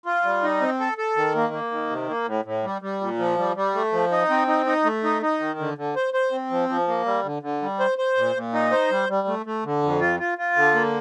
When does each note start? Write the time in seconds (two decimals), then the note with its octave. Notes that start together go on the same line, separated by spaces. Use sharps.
0.06 F4
0.24 G3
0.43 D#4
0.61 C4
0.80 A4
0.98 A4
1.16 D#3
1.35 A#3
1.53 A#3
1.71 D#3
1.90 C3
2.09 A#3
2.27 A2
2.45 A2
2.64 G3
2.82 G3
3.01 A#2
3.19 F3
3.38 G3
3.56 G3
3.74 A3
3.93 F3
4.11 D#4
4.30 C4
4.48 D#4
4.66 D#4
4.85 A3
5.04 D#4
5.22 D#4
5.40 D#3
5.59 D3
5.78 D3
5.96 C5
6.14 C5
6.32 C4
6.50 F3
6.69 F3
6.88 A#3
7.06 G3
7.24 D3
7.43 D3
7.62 G3
7.80 C5
7.98 C5
8.17 A#2
8.36 A#2
8.54 D#4
8.72 C5
8.91 G3
9.09 G3
9.28 A3
9.46 A3
9.65 D3
9.83 F2
10.01 F4
10.20 F4
10.38 F4
10.56 D3
10.74 A#3